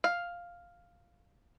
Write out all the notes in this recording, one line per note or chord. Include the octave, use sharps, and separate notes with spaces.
F5